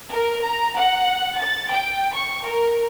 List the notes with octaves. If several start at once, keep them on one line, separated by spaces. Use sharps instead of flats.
A#4
A#5
F#5
A6
G5
C#6
A#4